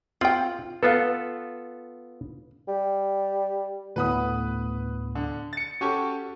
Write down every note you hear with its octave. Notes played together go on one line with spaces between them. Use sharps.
C4 F4 G5
B3 F4 A4 B4 F5
G3
D2 A2 B3 B4 B5 D#6
D3
A6 C#7
C#4 F#4 G4 A4 C#6